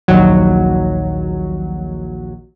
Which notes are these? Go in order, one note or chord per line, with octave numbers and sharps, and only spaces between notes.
A#1 D#2 F#3